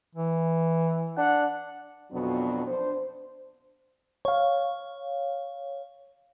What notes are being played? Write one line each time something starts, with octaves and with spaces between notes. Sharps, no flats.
E3
D4 F#5
F2 B2 F#3 B3 D4
D4 C5
C#5 F5